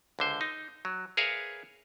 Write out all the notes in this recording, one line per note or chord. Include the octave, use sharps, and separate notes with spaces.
C#2 D3 C5
D#4
F#3
G#4 A#4 B4 C#5 E5 F5